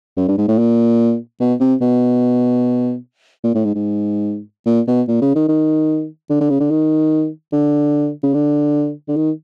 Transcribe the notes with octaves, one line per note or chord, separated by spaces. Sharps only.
F#2
G2
G#2
A2
A#2
B2
C3
B2
A#2
A2
G#2
G#2
A#2
B2
A#2
C#3
D#3
D#3
D3
D3
C#3
D3
D#3
D3
C#3
D3
D3
D#3